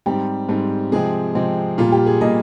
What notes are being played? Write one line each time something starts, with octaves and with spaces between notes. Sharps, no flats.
G#2 G3 C4 G4
G#2 G3 C4
C3 F3 G#3 C4 G#4
C3 F3 G#3 C4
A#2 G3 A#3 F4
G4
G#4
A#2 G3 A#3 D#5